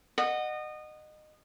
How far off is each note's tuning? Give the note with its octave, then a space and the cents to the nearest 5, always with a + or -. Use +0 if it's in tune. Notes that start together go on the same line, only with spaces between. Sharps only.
D#5 -25 F#5 -5